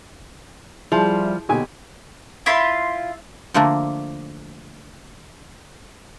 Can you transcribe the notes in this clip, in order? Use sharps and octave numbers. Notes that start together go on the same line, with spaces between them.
F3 G3 E4 G#4 C6
B1 A#2 D3 D#4 G4 D#5 G#5
E4 F4 B5 C6
D3 F3 A3 A#3 D4